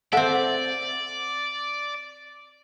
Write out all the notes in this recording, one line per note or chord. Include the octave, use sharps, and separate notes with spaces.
C4 A4 D5 E5 F#5